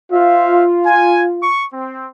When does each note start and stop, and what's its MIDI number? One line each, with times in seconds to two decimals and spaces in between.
0.12 1.50 65
0.12 0.64 72
0.12 0.64 76
0.12 0.64 77
0.86 1.22 80
1.43 1.65 85
1.73 2.07 60